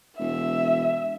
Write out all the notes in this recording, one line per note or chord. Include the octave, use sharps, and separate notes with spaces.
E1 E5